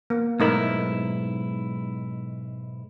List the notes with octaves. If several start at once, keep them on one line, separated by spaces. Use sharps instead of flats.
A#3
B1 G#2 A3 D#4 E4 A#4